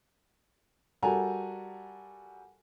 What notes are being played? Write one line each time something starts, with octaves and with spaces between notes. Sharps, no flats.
G3 F#4 A4 A#4 G#5 A#5